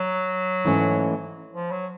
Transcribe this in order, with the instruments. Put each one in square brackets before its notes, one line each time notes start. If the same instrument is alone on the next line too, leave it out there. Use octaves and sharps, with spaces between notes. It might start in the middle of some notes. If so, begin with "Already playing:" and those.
Already playing: [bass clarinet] F#3
[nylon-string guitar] G#2 E3 A3 C#4
[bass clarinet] F3
F#3